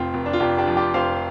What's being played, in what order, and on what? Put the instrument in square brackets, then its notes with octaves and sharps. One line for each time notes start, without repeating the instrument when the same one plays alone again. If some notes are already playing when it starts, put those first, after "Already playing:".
Already playing: [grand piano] F1 C4 F4
F1
D4
F4
F1 D4 G4
D4 G4
F3
D4 G4
F1 C5 F5